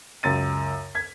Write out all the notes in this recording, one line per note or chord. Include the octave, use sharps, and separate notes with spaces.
C#2 F#2 A6 D#7
G#6 B6